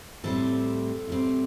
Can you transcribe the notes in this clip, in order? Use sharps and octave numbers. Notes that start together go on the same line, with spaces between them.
A2 G3 C4 A4 C5
A2 G3 C4